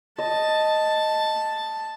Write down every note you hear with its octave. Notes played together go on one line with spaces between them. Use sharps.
D#5 A5